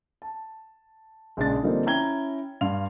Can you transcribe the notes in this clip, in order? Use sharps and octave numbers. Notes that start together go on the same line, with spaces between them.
A5
A#1 C#3 G#3 D4 A6
D3 F3 G3 A#3 C4 D#4
C#4 E4 G5 A#5 G#6 G7
G2 F5 C6 F7